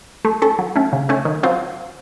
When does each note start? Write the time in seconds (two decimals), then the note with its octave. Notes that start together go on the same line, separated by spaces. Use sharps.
0.25 A3
0.42 C#4 A4
0.59 F#3
0.76 A3 C#4
0.93 C#3
1.09 A3 C#4
1.25 D#3
1.43 F#3 C4 F4